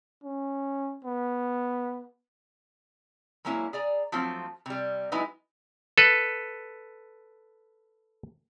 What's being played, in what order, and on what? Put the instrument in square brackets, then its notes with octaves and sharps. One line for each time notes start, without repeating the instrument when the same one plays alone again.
[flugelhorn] C#4
B3
[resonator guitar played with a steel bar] F#3 G#3 A#3 C#4 E4
G#4 D5 A#5
F3 F#3 A3 C4 F4
C3 G3
F#3 G#3 B3 D#4 E4 B4
[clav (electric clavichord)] A4 B4